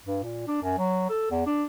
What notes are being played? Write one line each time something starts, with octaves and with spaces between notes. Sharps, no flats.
G2
A#2
D4
F#2
F#3
A4
E2
D4